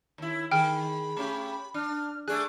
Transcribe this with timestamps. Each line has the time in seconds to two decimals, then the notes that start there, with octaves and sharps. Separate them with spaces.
0.18 D#2 E4
0.51 D#3 G#4 G5 B5 F6
1.17 A3 C#4 G4
1.74 D4 F6
2.28 A3 D4 G#4 F#6